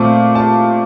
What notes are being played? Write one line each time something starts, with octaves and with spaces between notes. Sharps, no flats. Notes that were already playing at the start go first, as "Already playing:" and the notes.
Already playing: A#2 A3 C4
A5